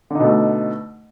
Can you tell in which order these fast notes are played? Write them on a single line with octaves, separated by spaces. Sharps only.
D3 D#4 B2 A3